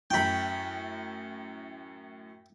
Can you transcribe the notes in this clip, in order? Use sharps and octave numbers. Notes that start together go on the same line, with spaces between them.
F#2 A2 G5 B5